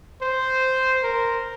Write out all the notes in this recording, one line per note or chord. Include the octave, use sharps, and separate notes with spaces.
C5
A#4